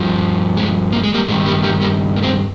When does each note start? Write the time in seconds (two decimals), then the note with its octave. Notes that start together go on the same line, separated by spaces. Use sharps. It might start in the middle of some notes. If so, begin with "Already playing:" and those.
Already playing: G2 F3
0.57 G#3
0.92 A#3
1.03 G#3
1.14 G3 A#3
1.28 G2 G#3
1.32 D#3
1.46 G3 A#3
1.63 G3 A#3
1.81 G3 A#3
2.16 A#3
2.23 G#3 C4